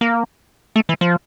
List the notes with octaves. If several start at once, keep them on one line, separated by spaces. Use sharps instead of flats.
A#3
A3
E3
F3